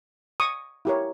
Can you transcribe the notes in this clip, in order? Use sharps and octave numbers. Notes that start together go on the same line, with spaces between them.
C#6 D#6
E4 G4 A#4 C#5